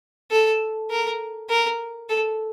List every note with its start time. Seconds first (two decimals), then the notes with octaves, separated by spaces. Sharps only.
0.31 A4
0.90 A#4
1.49 A#4
2.09 A4